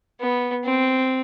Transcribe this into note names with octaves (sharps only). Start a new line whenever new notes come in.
B3
C4